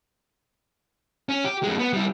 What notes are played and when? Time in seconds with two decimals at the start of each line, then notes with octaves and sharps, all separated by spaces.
1.29 C#4
1.45 G4
1.63 F2 G#3
1.79 B3
1.93 G3 E4